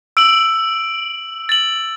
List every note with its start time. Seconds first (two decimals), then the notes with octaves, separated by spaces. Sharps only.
0.17 E6 D7 F#7
1.49 A6 F#7